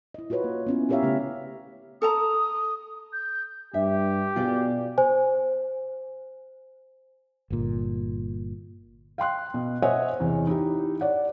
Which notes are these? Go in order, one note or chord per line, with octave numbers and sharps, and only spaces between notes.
E4 D#5
F4 F#4 A#4 B4 C#5
A#3
B3 C#4 E4
E4 G4 A#4 C#5 E5 F5
C#3 A3 C#4 G4
A4 A5 A#5 D#6
G6
G2 G4 E5
B2 F4 G#4 D5
C5 G#5
G1 A#2
F5 G5 C6 F#6
B2
C5 C#5 D#5 E5 F#5 G#5
E2 C3
D#4 E4 G4
C#5 D5 F#5